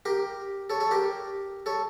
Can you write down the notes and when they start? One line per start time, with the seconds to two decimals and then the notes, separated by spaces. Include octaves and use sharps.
0.05 G4 A#4
0.70 A4 C#5
0.80 A4 C#5
0.91 G4 A#4
1.66 A4 C#5